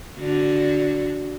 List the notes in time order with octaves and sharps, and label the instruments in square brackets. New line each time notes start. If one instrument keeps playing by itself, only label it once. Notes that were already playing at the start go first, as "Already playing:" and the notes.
[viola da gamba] D3 F#4